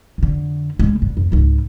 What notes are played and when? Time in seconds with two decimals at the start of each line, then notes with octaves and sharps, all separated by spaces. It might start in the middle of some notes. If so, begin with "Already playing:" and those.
0.18 F2 D3
0.79 C#3 G#3
1.02 G2
1.17 F2
1.32 C#2 G#2